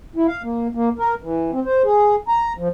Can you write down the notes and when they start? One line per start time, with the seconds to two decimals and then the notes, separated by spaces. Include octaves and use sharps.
0.16 E4
0.28 F5
0.43 A#3
0.75 A#3
0.99 A#4
1.22 E3
1.52 C4
1.65 C5
1.84 G#4
2.28 A#5
2.58 F3